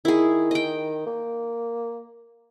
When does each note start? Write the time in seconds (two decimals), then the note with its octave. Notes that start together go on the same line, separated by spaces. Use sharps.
0.05 D#3 E4 G#4
0.51 D#5 G5
1.06 A#3